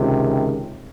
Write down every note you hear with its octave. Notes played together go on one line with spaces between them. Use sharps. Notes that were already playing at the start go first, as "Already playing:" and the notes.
Already playing: C#2 C3 D#3